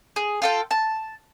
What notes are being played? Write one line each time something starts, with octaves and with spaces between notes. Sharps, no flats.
G#4
F4 A4 G5
A5